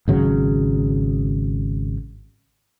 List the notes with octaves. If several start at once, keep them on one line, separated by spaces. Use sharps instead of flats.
G#1 C#3 F#3